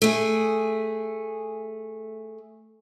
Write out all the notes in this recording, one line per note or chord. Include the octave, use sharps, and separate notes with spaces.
A3 G#4